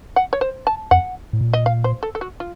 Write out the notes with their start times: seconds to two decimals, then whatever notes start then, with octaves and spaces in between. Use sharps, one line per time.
0.16 F#5
0.33 C#5
0.41 C5
0.67 A5
0.91 F2 F#5
1.33 A2
1.41 A#2
1.53 D#5
1.66 F5
1.84 C5
2.03 A4
2.15 A4
2.21 F#4
2.40 F4